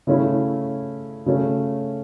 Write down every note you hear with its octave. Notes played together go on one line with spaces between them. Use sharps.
C#3 A3 C#4 E4
C#3 A3 C#4